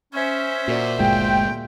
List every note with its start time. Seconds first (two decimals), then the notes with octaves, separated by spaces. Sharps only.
0.13 C#4 C5 E5
0.68 A#2 F#4 A#4 D5
0.99 G1 D2 A#2 G#3 F4 G#4 G5